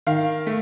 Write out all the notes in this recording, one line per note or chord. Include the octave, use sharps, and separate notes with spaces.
D#3 F5
A3